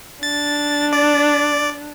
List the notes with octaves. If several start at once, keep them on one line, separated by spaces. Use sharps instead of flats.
D4 A6
D5